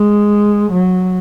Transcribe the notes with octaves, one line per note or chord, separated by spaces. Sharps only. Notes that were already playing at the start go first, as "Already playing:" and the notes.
Already playing: G#3
F#3